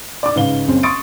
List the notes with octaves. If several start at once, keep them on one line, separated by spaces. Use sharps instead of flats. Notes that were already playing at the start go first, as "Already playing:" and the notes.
D5 D6
G#2 C#3 B4 F5 G7
F#1 C4 C#4
C6 C#6 D#6 A6 C#7 D7